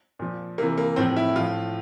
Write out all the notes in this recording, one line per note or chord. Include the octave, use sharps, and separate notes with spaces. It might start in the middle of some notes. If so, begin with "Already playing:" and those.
A#2 F3
C3 E3 A#3
A#3
A2 F3 C4
E4
A2 F3 F4